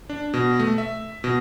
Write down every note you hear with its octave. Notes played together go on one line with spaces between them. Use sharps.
D4
B2
A3
E5
B2